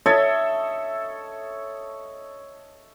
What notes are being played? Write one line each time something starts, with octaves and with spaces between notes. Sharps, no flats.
A4 C#5 D#5 E5